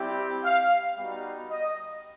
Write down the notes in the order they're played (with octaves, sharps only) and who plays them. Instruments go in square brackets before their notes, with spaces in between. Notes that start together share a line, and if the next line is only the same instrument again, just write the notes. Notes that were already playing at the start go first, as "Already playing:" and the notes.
Already playing: [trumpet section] G3 C4 E4 G4
F5
G3 B3 D#4 F#4
D#5